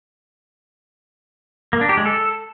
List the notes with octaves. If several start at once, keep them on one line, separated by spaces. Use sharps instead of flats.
A#3
D4
G4
G#3
A4